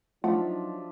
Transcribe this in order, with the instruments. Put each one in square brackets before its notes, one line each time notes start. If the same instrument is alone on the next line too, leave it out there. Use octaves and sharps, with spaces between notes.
[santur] F3 D4 E5 [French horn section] F#3 D#4 [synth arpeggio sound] A3 F4 F#5